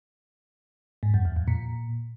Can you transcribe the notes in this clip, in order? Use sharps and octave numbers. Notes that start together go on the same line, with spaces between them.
G#2
F#2
E2
F2
A#2